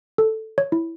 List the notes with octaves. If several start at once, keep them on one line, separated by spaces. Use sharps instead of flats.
A4
C#5
E4